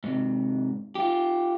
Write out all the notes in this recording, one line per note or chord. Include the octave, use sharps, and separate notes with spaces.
G#2 C3
F4 G4